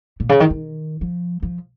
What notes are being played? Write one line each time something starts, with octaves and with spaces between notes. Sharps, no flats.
A#2
C#3
D#3
D#3
F3
F3